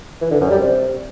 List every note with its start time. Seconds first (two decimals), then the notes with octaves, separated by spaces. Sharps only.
0.21 E3
0.31 D3
0.41 F#2
0.50 G3
0.60 C3